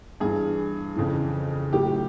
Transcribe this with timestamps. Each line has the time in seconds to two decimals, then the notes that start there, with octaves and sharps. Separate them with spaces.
0.20 G2 E3 G#4
0.96 F2 C#3 E3
1.73 A2 F#3 G4